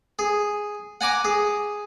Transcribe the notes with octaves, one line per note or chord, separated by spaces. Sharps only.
G#4
F#5 G#5 A#5 D6
G#4